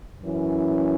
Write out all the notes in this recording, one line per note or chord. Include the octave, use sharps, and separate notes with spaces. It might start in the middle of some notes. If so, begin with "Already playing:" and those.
F#2 E3 C#4 E4